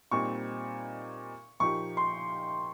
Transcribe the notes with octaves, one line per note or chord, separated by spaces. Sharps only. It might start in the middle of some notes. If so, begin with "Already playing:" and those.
A#2 G3 C4 D#4 C#6
A#2 F3 A#3 D#4 G4 C#6
C6